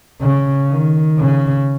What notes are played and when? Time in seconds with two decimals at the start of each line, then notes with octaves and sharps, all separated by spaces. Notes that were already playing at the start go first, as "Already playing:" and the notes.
0.21 C#3
0.70 D#3
1.19 C#3